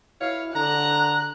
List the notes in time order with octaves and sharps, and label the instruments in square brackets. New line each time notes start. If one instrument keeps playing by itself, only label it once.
[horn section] B2 C#5 F5 [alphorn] E4
[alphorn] D3 [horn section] A#5 [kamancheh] F#6